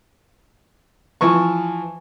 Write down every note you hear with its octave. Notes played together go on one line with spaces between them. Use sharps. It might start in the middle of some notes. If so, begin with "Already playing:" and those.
E3 F3 C#6